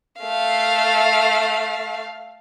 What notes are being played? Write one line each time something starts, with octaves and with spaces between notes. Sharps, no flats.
A3 F5